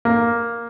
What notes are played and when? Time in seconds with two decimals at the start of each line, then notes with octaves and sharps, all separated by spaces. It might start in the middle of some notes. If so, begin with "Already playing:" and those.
0.05 A#3